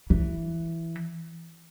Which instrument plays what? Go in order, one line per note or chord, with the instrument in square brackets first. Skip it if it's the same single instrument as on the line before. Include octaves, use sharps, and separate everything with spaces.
[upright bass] E3